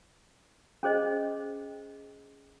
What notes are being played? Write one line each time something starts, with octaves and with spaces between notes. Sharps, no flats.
C#4 G#4 C5 D#5